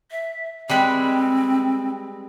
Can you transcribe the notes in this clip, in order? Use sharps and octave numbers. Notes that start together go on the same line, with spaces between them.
E5
G3 G#3 C4 B4